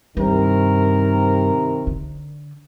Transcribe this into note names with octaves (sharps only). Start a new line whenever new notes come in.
G2 C3 D#3 A#4
D3